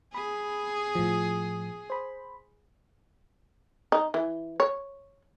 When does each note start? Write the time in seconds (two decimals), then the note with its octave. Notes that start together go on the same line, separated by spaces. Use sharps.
0.14 G#4 B5
0.95 A2 F3
1.90 C5 B5
3.92 D#4
4.14 E3
4.60 C#5